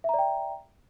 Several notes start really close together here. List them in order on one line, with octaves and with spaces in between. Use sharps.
E5 A#5 D5 G5